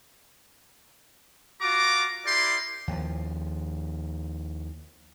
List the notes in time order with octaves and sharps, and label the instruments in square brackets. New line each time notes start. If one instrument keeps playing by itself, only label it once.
[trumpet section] F4 F#4 A#5 D6
E4 G4 A#4 D5 C6
[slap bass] D#2 F3